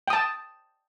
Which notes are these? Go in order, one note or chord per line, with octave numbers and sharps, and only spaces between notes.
G5 A5 D#6